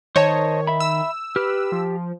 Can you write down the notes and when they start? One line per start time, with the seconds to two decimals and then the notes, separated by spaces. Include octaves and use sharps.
0.16 D#3 C5 C#5 D#5 A5
0.67 E5 B5
0.80 E6
1.36 G4 B4 F6
1.72 F3